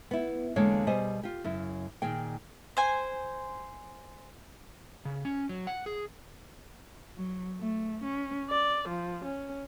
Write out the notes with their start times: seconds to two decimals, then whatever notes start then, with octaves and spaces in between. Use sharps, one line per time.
0.11 B3 E4
0.56 E2 D3 G#3 A#3 C#5 F5
0.87 B2 G3 G#4 C5 D#5 G#5
1.23 F4 G4
1.44 F#2 C#3 E4
2.02 A#2 D#3 G#4 G5
2.77 C5 G#5
5.05 C#3
5.25 C#4
5.49 F#3
5.67 F#5
5.86 G#4
7.16 F#3
7.60 A3
8.03 C#4
8.49 D5
8.89 F3
9.23 C#4